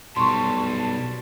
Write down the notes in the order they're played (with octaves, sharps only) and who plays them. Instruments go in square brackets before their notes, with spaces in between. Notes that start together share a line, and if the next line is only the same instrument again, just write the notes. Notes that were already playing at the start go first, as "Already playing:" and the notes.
[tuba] B1 [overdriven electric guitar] B2 G3 [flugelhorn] A5 [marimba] C6 C#6